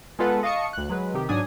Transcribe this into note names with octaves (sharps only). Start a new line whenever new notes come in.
G#3 B3 F4 A4 B4 F#5
D#5 F5 A5 C#6 D#6 C#7
D2 F#6
F#3 G#3 B4
C3 D#3 G4
G#2 F#3 D4 D5 G#5 D#6